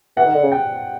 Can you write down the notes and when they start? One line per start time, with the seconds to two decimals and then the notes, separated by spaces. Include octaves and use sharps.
0.17 E3 F#5
0.25 D#3
0.34 D3
0.43 C#3
0.52 G5